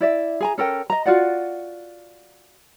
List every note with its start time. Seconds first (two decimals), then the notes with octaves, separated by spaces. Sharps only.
0.01 E4 D5 E5
0.40 G#4 G#5 A#5
0.58 C#4 A4 A#4 G5
0.90 D#5 A#5
1.06 F4 F#4 D5 F#5